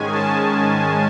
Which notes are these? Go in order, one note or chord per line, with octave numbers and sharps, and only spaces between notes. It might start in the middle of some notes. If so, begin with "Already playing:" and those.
Already playing: G#2 D#3 G#3 C#4 G#5
A5